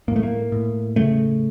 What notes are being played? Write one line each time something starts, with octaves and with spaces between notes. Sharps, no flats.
A2 A#3
A3
A#3
A2
C#3 A3